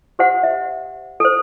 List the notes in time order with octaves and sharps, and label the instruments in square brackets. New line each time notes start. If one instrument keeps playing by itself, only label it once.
[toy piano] G4 C5 F#5
E5
A4 C5